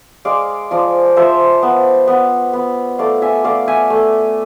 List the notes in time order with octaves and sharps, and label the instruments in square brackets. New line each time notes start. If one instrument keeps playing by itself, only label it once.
[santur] G#3 D5 F5
F3 D5 F5
F3 C5 E5
B3
B3
B3
A3 D5 F5
E5 G#5
A3 D5 F5
E5 G#5
A3